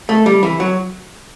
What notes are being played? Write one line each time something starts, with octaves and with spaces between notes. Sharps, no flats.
A3
G3
E3
F#3